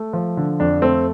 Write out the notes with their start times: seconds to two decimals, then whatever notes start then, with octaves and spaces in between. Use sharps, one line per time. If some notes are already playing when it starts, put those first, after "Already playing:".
Already playing: A3
0.13 F3
0.37 D3
0.60 F2 D4
0.82 A3 C4